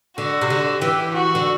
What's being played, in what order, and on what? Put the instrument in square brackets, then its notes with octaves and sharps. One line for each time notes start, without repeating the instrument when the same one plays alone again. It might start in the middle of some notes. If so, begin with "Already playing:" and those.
[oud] D3 [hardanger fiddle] F#4
[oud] C3
D3
[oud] E3 [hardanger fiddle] G4
[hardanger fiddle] F#4
[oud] D3